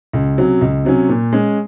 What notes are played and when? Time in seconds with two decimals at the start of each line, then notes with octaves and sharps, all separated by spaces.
0.13 C#2
0.37 C3 F#3 C#4
0.61 C#2
0.85 C3 F#3 C#4
1.09 A#2
1.33 G#3 C#4